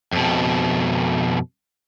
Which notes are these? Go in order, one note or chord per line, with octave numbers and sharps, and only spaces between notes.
F2 B2